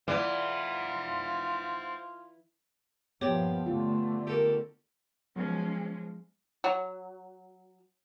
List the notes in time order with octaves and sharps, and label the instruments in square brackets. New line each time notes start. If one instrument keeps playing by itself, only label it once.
[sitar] E3 [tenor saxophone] F4 [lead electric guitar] C5 F#5 [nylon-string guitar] D5
[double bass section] G2 A#2 F3 [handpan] B3 [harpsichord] G4 D5 [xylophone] C#5 D6
[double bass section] D3 A3 [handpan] F4
[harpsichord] G4 A4 A#4
[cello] F3 G#3 [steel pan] F#3 B3 [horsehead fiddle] C#4
[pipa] F#3